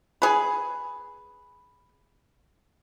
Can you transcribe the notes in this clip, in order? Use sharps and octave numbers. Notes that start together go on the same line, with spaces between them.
G#4 B4